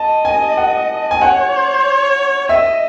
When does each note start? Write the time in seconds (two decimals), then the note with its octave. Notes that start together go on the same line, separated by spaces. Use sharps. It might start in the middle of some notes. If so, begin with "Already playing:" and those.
Already playing: D#5 A5
0.25 G#5
0.57 F#5
1.11 G#5
1.21 C#5 F#5
2.49 D#5 E5